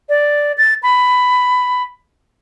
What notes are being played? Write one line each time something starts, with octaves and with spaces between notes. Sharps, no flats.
D5
A6
B5